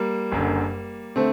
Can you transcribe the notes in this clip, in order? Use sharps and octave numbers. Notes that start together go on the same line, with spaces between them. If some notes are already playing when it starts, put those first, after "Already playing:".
Already playing: G3 A#3
F#1 F#2 D3
D3 A3 C4